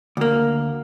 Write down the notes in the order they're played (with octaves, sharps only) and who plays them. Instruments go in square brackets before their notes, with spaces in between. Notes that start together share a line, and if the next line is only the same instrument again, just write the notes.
[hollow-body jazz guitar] D2 A#3